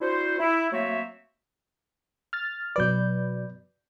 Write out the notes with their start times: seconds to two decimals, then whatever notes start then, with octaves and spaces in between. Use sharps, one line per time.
0.01 D4 E4 F#4 C5
0.40 E4
0.73 F#3 A3 A#3 C4 C#5 E5
2.33 F6 A6
2.76 B2 F#3 B4 D5 G6